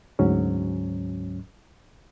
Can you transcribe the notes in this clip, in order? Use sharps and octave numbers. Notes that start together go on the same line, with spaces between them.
D2 G#2 F#3 C#4